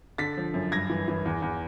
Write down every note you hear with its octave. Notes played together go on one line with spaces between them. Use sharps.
D3 A6 B6
F3
F#2
G2 G#6 A#6
E3
E3
E2
E2